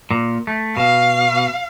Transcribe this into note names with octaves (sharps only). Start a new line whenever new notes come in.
A#2
A3
B2 F5